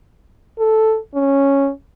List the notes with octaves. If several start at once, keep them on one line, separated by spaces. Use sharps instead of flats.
A4
C#4